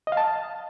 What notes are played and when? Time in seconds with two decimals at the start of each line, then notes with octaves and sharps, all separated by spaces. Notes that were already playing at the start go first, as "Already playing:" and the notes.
0.07 D#5
0.12 F5
0.17 A5